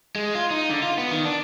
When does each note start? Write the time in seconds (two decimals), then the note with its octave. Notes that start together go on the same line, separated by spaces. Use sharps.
0.16 G#3
0.35 F4
0.51 D#4
0.70 D3
0.83 F4
0.98 B3
1.11 D#3
1.25 D4